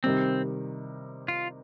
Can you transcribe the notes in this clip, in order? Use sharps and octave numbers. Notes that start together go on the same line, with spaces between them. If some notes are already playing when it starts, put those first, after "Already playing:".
C3 D#3 G3 C4
F4